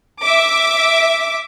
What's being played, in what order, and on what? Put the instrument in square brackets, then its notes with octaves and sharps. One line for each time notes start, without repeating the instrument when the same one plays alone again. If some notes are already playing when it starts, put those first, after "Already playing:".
[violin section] E5 D6